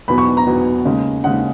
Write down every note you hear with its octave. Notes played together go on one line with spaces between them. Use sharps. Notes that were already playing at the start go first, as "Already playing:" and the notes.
E2 B2 F#3 B3 B5
C#6
A#5
E2 B2 F#3 B3
D#2 C#3 G#3 C#4
D#2 C#3 G#3 C#4 F#5